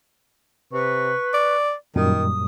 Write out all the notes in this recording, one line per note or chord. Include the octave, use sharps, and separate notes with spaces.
C3 B4 C#6
D5
F#2 A#2 D#3 G3 D#6